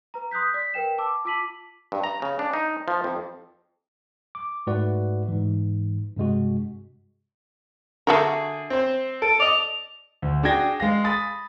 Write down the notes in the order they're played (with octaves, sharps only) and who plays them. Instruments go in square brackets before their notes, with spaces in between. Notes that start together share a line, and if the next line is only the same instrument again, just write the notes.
[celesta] B4 A#5
C6 D#6 F#6 G6 B6
D5 B6
A#4 B4 G5 E7
A5 D6 E6
F4 A5 D6 B6 D#7 F#7
[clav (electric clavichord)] G2
A#5
C#3
D4
D#4
F3
F2
[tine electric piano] D6
G#2 A3 F#4 B4 D5 F#5
G#2 E3
G2 C3 G#3 F#4
[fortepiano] D3 G#4 [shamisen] A3 F#4 A#4
[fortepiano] C4 C5
[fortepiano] A4 [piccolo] D7
[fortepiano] D5 D#5 [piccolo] F7
[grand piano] D2
D4 F#4 G#4 G5 G#6 A#6
G#3 F5 A#6
B5 D#6 A6